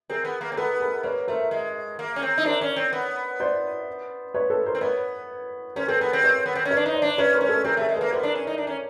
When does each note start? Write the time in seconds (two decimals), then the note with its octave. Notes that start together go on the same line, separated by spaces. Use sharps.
0.09 C4 G#4 A#4
0.25 B3
0.41 A#3
0.52 C4
0.57 B3 A4 B4
0.80 G#4 A#4
1.03 A#3 B4 C#5
1.28 A3 A#4 C5
1.51 G#3
1.99 A#3
2.16 C#4
2.22 C4
2.38 D#4
2.45 D4 A#4 C5
2.61 C#4
2.76 C4
2.93 B3
3.40 C5 D5
4.34 B4 C#5
4.50 A4 B4
4.66 A#4 C5
4.75 C4
4.81 B3 B4 C#5
5.76 C#4 A#4 C5
5.88 C4 A4 B4
5.99 B3 G#4 A#4
6.13 C4
6.23 B4 C#5
6.46 B3
6.55 C4
6.65 C#4
6.71 B4 C#5
6.77 D4
6.86 D#4
6.94 C5 D5
7.02 D4
7.18 C#4 B4 C#5
7.34 A#4 C5
7.41 C#4
7.49 A4 B4
7.64 C4 G#4 A#4
7.77 A3 G#4 A#4
7.89 G#3
7.96 A#3 A4 B4
8.12 B3 A#4 C5
8.23 D4
8.35 C#4
8.47 D#4
8.58 D4
8.67 C#4